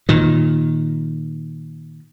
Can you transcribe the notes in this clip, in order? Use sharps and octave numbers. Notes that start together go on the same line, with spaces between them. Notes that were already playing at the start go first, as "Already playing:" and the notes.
A#2 D#3